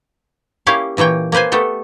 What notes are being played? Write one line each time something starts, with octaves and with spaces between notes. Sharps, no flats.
A#3 C#4 E4 G4 C#5 F5
A#2 E3 A#3 C#5 G5
A#3 C4 B4 C5 G#5
A3 B3 G4 A4